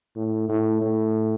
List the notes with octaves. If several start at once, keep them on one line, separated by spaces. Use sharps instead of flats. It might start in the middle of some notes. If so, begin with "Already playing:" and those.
A2
A2
A2